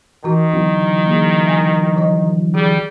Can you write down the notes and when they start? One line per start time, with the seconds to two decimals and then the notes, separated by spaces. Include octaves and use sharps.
0.24 D#3 E3 F#4
0.53 D3 E3 F#3 B3
1.06 A#3 G#4
1.45 E5 G#5
1.97 F3 D#5
2.55 G3 G#4